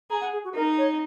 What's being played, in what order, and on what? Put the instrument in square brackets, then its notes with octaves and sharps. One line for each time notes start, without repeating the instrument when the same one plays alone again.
[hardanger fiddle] G#4 [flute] A#5
[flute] F#5
G#4
F#4
[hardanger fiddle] D#4 [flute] A#4
[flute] C#5